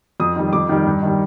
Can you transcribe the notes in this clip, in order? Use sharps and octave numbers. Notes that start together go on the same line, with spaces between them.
F2 D#6
D#3 G3
F2 D6
D#3 G3
G2
D#3 G3